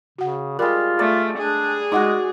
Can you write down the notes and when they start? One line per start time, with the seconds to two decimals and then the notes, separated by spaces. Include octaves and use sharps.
0.19 C#3 F#4 F#5
0.59 G3 G#3 F4 A#4
0.99 A3 D5
1.38 D4 G#4
1.92 G#3 D#4 F#4 D#5 F#5 D6